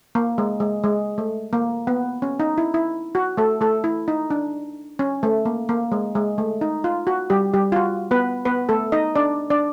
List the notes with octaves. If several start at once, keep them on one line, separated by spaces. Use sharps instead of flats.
A#3
G#3
G#3
G#3
A3
A#3
B3
C#4
D#4
E4
E4
F#4
A3 A4
A3 A4
E4
D#4
D4
C#4
A3
A#3
A#3
G#3
G#3
A3
D#4
F4
F#4
G3 G4
G3 G4
F4
F#4
B3 B4
B3 B4
A3 A4
D#4 D#5
D4 D5
D4 D5